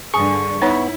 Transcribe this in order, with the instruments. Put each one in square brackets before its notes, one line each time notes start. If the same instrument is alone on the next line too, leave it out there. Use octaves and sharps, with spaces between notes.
[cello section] G2 D3 [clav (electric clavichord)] G#4 [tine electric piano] C#6
[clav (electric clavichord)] B3 [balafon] D#4 C#5 [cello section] E4